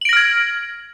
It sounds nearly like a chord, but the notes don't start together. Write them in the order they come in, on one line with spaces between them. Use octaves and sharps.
F#7 D7 A#6 F6 G#6